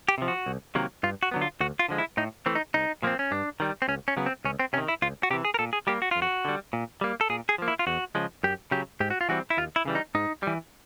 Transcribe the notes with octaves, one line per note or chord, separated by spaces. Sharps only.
G4
C3 F3
F#4
C2
C3 D#3 F#3 A#3
G2 F4
F#4
D3 F#3 B3
F4
D2 F#4
F4
D3 F3 G#3
E4
A2 D#4
E3 A3 C4
D#4
C2 D#4
A#2 F3 A#3 C4
C#4
G2 D4
D#3 G3
C4
C#2 C#4
C#4
C#3 F#3 B3
C4
C#2 C#4
C4
C3 D#3 C#4
E4
C#2 F4
F#4
C3 E3 G4
G#4
A#4
A#2 A4
G#4
G3 A#3 G4
F#4
F2 F4
F#4
D3 G3
A#2
G3 A#3
A4
A#2 G#4
G#4
F3 A#3
E4
F4
E2 F#4
C#3 F3 G#3
F#2 G4
C#3 F#3 G4
G#2 G4
F#4
F4
E3 G3 C4 F#4
E4
D#2 F4
E4
C#3 E3 G3
D#4
G#2 D#4
E3 G3